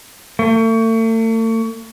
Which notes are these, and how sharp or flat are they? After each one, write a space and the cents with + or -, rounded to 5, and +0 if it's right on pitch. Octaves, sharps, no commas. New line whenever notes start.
A3 +40